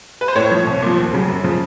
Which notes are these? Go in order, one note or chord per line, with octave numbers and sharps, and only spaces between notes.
B4
C5
A2 C#5
F3
C2
A#2 F3
D#2
C#3 F#3
F#2
C#3 F3